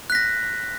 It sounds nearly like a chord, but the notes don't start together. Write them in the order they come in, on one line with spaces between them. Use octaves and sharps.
F#6 B6 A#6